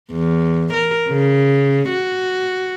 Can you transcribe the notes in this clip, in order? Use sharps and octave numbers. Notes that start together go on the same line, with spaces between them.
E2
A#4
C#3
F#4